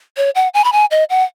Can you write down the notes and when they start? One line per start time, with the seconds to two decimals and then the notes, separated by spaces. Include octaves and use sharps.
0.17 C#5
0.35 F#5
0.54 G#5
0.64 B5
0.72 G#5
0.91 D#5
1.10 F#5